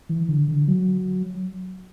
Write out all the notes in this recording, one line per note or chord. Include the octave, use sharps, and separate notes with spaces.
E3
D3
D3
F#3